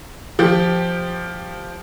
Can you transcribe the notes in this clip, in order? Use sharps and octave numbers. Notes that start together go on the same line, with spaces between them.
F3 G4